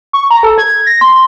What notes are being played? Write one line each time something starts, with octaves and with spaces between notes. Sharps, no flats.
C#6
A#5
A4
G#6
A#6
C6